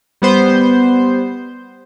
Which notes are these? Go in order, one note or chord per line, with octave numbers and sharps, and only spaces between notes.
G3 B3 C5 G6